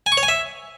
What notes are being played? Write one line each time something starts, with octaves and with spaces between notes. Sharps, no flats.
G#5
C#6
C#5
G#5
E5